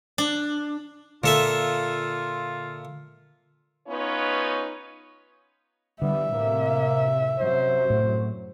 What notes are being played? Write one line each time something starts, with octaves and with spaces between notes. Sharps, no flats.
D4
A#2 D3 F4 A4 E5
B3 C#4 D#4 F4 B4 C#5
D3 E3 G3 B3 E5
A2 C3 A#3
F#2 C3 F#3 C5
A2